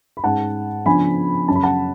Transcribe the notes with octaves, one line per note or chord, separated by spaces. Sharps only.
B5
G#2 G#3 C#4 F#5 A5
C#3 F3 B3 D4 G#5 B5
F#2 C#3 F#3 A5
B5
F#5 A5